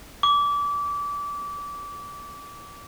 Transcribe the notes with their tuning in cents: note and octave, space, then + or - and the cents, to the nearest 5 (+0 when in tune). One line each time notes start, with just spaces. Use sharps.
D6 -25